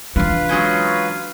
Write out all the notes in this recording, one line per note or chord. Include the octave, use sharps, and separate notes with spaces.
E3 D4 F4 B4
F#3 G#3 C#4